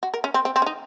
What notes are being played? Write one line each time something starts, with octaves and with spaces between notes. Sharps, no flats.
F#4
A#4
C#4
C4
C4
C4
C#4
D#4